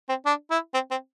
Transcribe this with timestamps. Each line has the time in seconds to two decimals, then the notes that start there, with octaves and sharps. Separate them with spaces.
0.09 C4
0.25 D4
0.51 E4
0.74 C4
0.91 C4